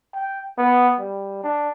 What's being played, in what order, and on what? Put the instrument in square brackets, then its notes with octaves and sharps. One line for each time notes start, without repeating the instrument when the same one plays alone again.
[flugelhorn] G5
B3
G3
D4